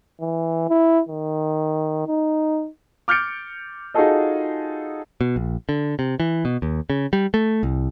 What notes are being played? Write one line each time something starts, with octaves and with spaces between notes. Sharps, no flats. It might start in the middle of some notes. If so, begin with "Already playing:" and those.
E3
E4
D#3
D#4
D6 F6 G6 A6 C#7 D7
D#4 F4 F#4 G#4 A4 D#5
B2
A#1
D3
C3
E3
B2
D#2
C#3
G3
A3
C2